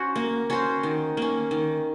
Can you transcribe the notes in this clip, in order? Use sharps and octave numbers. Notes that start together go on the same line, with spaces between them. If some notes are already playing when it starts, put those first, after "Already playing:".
Already playing: C#4 F#4 C5
A#3
C#4 F#4 C5
D#3
A#3 C#4
D#3